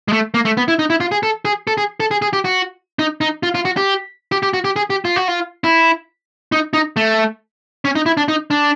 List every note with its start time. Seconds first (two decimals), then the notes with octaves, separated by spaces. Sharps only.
0.08 G#3
0.13 A3
0.34 A#3
0.45 A3
0.57 B3
0.68 E4
0.79 D#4
0.90 E4
1.00 F4
1.12 G#4
1.23 A4
1.45 G#4
1.67 A4
1.78 G#4
2.00 A4
2.11 G#4
2.22 G#4
2.33 G4
2.45 F#4
2.99 D#4
3.21 D#4
3.43 F4
3.55 F4
3.65 F#4
3.77 G4
4.32 G4
4.43 G4
4.54 F#4
4.64 G4
4.76 G#4
4.90 G4
5.05 F4
5.16 F#4
5.28 F4
5.64 E4
6.52 D#4
6.73 D#4
6.96 A3
7.85 C#4
7.95 D#4
8.06 E4
8.17 D4
8.28 D#4
8.50 D4